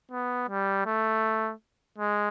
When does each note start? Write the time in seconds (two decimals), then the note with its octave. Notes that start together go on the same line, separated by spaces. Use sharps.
0.11 B3
0.49 G3
0.86 A3
1.98 G#3